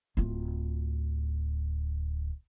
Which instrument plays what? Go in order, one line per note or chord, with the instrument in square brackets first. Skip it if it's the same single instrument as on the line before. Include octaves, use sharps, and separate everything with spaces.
[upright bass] D1 F4